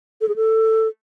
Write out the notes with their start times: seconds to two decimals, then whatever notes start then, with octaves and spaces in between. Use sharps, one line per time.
0.21 A4
0.28 G#4
0.36 A4